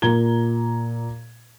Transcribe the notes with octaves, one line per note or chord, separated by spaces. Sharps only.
A#2 A#4 A#5 G#6 G7